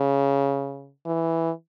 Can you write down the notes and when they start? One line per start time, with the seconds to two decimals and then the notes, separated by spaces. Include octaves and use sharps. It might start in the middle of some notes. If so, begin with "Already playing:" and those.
Already playing: C#3
1.06 E3